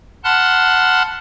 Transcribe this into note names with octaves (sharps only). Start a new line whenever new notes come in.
F#5 A5 B5 C6 F6 F#6